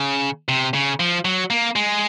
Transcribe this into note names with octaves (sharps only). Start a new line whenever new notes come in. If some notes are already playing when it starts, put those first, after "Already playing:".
Already playing: C#3
C3
C#3
F3
F#3
A#3
G#3